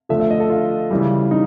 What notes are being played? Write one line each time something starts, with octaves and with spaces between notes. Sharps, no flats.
D3 F3 A3 E5
E5
D#5
A4
F4
C#3 E3 G3
D#4